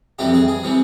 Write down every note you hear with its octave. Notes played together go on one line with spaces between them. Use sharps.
F2 C3 E3 G3 G4
G#4
G#4
C3 E3 G3